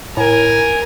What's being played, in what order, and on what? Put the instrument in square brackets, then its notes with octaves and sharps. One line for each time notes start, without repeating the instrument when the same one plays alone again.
[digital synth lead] A2 [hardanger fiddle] A#4 [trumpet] G#5